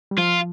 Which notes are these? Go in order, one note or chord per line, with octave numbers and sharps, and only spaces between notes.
G3
F3 F4